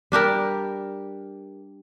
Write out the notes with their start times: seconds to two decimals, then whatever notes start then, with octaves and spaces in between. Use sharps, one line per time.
0.12 G3 D4 G4 A#4